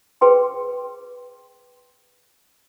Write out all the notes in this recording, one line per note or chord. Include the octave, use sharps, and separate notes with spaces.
G#4 B4 G5 C6